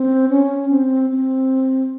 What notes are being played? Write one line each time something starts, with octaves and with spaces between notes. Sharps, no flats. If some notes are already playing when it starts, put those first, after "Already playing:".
Already playing: C4
C#4
C4
C4